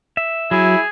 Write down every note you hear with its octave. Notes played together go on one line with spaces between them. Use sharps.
E5
F#3 E4 G#4